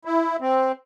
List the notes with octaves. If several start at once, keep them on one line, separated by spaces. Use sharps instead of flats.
E4
C4